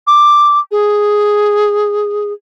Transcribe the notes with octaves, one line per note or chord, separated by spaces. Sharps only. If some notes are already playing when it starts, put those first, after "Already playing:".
D6
G#4